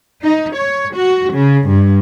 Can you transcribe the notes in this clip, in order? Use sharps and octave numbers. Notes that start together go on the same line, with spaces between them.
D#4
C#5
F#4
C#3
G2